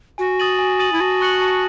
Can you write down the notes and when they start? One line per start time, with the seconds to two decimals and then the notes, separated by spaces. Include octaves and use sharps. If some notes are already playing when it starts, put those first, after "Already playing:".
0.18 F#4 G#5
0.39 D#6 A6 D#7 F#7
0.59 G#5
0.79 D#6 A6 D#7 F#7
0.93 E4
1.00 F#4 A5
1.21 C#6 F#6 C#7 F#7
1.41 A5